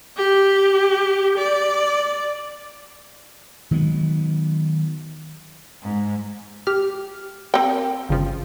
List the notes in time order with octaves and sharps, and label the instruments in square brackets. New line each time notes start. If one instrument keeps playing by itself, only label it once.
[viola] G4
D5
[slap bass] D#3 F#3 G#3 B3
[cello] G#2
[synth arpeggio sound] G4 F6
[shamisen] C4 G5 [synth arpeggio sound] A#4
[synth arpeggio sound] G1 C#3 F3